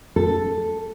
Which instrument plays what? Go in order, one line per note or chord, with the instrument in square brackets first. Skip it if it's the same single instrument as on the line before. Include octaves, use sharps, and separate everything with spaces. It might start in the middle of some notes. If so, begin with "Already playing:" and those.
[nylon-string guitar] A4